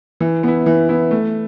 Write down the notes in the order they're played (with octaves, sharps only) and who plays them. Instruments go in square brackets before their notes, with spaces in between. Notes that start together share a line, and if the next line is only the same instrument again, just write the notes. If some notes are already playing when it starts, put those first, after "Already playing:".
[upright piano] E3
B3 E4
E3
B3 E4
A3